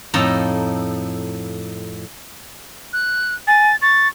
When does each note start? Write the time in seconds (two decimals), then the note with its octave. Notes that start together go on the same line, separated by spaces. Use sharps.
0.14 F2 A2 D#4 A4 A5 A#5
2.93 F#6
3.47 G#5 A6
3.82 C#6 A6